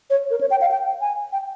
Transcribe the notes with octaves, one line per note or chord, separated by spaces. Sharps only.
C#5
A#4
C#5
G5
F5
G5
G#5
G5